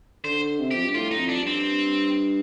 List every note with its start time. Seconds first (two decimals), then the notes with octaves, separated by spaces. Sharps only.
0.24 D3 C5
0.59 C3
0.71 F2 G4
0.85 G2
0.94 A2 F4
1.11 D#4
1.17 F2
1.29 D4
1.41 G2
1.47 C4